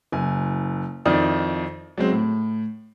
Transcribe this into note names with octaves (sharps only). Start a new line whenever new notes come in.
F#1 G#5
F2 D#3 E4 D5 D#6
F#3 G#3 C4
A2